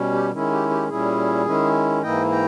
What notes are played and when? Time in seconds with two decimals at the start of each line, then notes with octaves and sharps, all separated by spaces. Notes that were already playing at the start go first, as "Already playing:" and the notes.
Already playing: B2 G3 C#4
0.13 G4
0.32 D#3 G#3 C#4 E4
0.51 G4
0.70 G4
0.88 A#2 G3 C#4 E4 G#4
1.45 D#3 G#3 C#4 E4
2.03 G#2 E3 A#3 E4 D#5 G5
2.31 G5 A#5